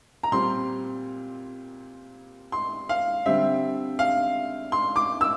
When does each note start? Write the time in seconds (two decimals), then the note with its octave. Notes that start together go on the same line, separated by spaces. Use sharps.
0.23 A#5
0.32 A#2 G3 C4 C6
2.52 C6
2.89 F5
3.26 D3 G3 C4 E5
3.99 F5
4.72 C6
4.96 D6
5.21 E6